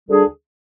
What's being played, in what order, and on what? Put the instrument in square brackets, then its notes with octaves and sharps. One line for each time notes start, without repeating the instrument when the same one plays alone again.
[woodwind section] D2 D3 G3 D4 G#4